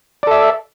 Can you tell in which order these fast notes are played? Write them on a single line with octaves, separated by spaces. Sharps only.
D5 A4 E5